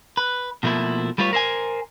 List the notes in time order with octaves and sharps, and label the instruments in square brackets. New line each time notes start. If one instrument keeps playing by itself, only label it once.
[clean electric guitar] B4
B2 F3 A3 A#3 E4
G3 A3 F4 B4 C#5
A#4 C5 E5 G#5